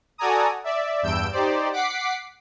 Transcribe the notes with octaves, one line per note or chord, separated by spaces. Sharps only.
F#4 A4 D5 G#5 A#5 D#6
D5 E5
E2 G2 E6 G6 D7
D#4 G4 C5 D5
F#5 D6 B6 C7